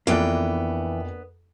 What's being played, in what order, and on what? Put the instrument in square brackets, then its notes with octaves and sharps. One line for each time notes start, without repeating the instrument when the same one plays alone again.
[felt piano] F2 [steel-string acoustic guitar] E3 G5 [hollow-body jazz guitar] A#3 B3 D4